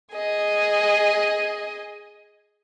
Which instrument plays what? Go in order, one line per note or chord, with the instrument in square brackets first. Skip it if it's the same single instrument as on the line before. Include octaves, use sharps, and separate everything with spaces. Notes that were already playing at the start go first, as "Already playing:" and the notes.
[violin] G#4 D#5